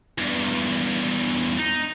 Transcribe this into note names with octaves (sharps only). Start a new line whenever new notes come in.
E2 G2
D#4